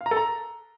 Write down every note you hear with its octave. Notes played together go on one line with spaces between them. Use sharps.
F5
A#5
A4
A#5